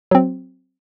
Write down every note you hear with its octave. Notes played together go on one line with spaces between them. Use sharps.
F#3 C4